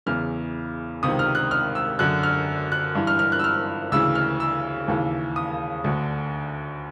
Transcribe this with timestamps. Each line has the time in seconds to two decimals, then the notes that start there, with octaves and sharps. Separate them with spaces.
0.06 E2 C#3 E3 F6
1.03 C#2 C3 D#3 D#6
1.19 F6
1.35 F#6
1.51 F6
1.75 E6
1.99 F#2 D3 F#6
2.23 F6
2.72 F#6
2.95 G2 E3
3.07 F6
3.19 F6
3.32 F#6
3.39 E6
3.44 F6
3.92 D2 C#3 E3 E6
4.15 F6
4.40 E6
4.88 D#2 C#3 E3
5.36 D#6
5.84 D2 D3